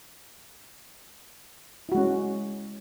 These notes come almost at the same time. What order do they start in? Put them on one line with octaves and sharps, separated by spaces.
E4 F#4 G#3 C#4